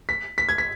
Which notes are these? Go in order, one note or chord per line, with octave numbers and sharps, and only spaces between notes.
B6
B6
G#6
B6